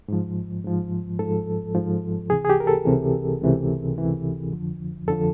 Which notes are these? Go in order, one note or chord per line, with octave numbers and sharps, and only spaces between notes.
G#2 F3
G#2 F3
G#2 F3 A4
G#2 F3
C#2 C3 E3 G#4
G#4
G4
A#4
A4
C#2 C3 E3
C#2 C3 E3
C#2 C3 E3
F2 D3 F3
F2 D3 F3 A4